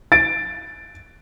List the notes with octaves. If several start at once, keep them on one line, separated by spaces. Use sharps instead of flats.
A6 D7